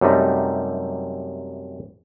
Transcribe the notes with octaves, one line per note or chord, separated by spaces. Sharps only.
F#2 C3 G3 A3 D#4